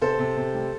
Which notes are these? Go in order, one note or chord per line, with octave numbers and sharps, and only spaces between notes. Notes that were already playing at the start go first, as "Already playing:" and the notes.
C3 A4 C5
C3
C3
G3